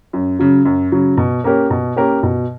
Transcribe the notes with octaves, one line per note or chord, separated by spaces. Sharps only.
F#2
C#3 F#3
F#2
C#3 F#3
B2
A#3 C#4 G4 A#4
B2
A#3 C#4 G4 A#4
B2